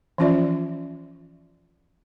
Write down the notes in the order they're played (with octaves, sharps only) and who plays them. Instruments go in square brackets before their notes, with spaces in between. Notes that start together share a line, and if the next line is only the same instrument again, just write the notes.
[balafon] E3 F3 C#4 F4 D5 E5